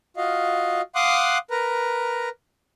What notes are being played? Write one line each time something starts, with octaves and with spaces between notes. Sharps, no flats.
F4 F#4 D#5 F5
F5 F#5 C6 D6 D#6 F#6
A#4 B4 A#5